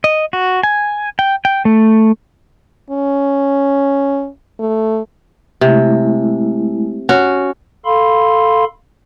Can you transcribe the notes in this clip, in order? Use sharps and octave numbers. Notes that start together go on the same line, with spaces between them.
D#5
F#4
G#5
G5
G5
A3
C#4
A3
C3 G#3 A3 E4
C#4 F#4
A4 F5 B5 C6